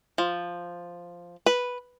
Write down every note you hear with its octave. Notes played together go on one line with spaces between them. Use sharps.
F3
B4